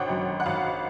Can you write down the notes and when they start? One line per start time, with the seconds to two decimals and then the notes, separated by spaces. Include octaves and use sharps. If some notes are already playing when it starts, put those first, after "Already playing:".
Already playing: G#1 D3 C5 C#5 F#5 G5
0.09 F#2
0.40 F#5
0.46 G#1 F5